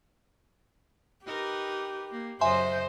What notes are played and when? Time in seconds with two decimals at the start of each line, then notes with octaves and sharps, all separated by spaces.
1.26 D#4 G4 A#4 B4
2.12 A#3
2.41 F#2 C#3 C5 D#5 E5 G#5 C6